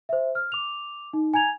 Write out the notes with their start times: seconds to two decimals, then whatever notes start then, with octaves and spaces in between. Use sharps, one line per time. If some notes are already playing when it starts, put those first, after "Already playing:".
0.09 C5 E5
0.35 F6
0.52 D6 F7
1.13 D#4
1.34 G#5 A#5 G#6 F7